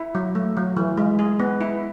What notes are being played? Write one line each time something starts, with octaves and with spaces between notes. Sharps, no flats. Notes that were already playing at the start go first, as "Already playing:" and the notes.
Already playing: E4
F#3
A3
F#3
E3
G#3
G#4
B3
E4